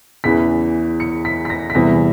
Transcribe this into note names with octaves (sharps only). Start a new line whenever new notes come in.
E2 C#3 E3 B6
C#7
B6
B6
A#6
B6
E2 C3 E3 G3 A#6